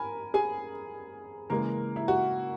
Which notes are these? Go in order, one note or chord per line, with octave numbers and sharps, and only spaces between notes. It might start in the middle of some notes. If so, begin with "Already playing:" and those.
Already playing: A#4 G#5 B5
G#4 G#5
C#3 E3 G#3 A#3 A#4
E4
F#4